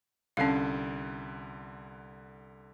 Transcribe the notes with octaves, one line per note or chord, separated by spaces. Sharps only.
C2 D3 C#4 F5 C7